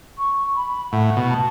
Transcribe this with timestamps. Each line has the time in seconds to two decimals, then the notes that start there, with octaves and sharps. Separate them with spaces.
0.18 C#6
0.55 B5
0.92 A2 F#5
1.17 B2
1.23 B5
1.30 A5